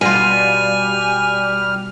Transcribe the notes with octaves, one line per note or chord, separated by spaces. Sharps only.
B2 G3 F4 G#5 F6